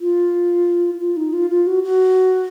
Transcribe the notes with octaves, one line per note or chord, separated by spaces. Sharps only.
F4
F4
D#4
F4
F4
F#4
F#4